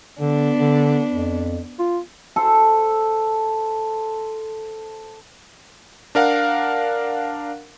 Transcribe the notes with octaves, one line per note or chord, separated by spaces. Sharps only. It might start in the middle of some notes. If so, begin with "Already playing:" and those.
D3 B3 D4
D3
F2
F4
A4 C5
D4 A#4 F5 F#5